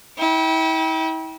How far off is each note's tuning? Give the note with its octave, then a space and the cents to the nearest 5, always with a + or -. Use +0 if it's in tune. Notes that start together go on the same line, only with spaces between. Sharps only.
E4 -35 G5 -10